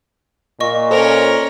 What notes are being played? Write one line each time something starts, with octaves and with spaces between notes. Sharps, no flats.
A#2 D#5 C#6
C#4 A4 A#4 C5